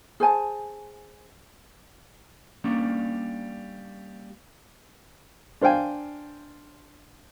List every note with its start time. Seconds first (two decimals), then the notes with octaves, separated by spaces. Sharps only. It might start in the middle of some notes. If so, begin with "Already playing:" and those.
0.20 G#4 C5 G#5 A5
2.64 G3 A#3 C#4 D4
5.61 D4 C5 F5 G5 G#5